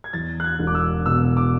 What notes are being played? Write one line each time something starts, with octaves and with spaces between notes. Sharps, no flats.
G#6
E2 A6
F#6
G#6
E1
D6
E6
B2 E6
D6